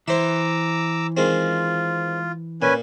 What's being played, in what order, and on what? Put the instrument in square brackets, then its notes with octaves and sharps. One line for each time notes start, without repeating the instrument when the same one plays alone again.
[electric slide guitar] E3 [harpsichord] C5 E5 [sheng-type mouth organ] A#5 D6 E6
[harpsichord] D#3 G#3 C4 [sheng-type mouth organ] F4
[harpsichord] A#2 [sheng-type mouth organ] C#4 B4 G#5